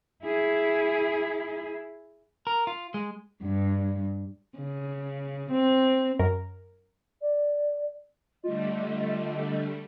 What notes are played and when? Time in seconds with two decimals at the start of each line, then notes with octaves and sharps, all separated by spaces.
0.24 E4 G#4
2.47 A#4
2.67 F4
2.94 G#3
3.42 G2
4.58 C#3
5.51 C4
6.19 F#2 A#4
7.21 D5
8.44 D3 G3 A3 F4 D#5